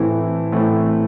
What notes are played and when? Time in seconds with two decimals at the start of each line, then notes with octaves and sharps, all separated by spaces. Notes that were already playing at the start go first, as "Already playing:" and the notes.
Already playing: A2 E3 A3 C4 E4
0.52 A2 E3 A3 C4 E4